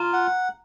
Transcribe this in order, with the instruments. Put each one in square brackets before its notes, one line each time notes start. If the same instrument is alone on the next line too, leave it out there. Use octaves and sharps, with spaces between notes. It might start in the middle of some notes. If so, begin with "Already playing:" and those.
Already playing: [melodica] F4 [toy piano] A#5
[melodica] F#5